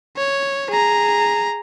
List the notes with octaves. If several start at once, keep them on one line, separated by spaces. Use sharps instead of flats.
C#5
G#4 A#5